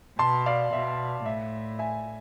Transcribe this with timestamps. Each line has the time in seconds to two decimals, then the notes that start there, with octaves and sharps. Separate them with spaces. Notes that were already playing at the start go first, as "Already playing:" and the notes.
0.19 B2 A5 C6
0.46 D5 F5
0.73 B2 E5
1.25 A2 E5
1.79 E5 G#5